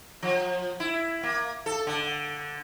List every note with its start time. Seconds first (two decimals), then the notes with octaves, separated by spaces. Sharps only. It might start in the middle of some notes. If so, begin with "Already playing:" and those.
0.22 F3
0.80 E4
1.23 A#3
1.66 A4
1.87 D3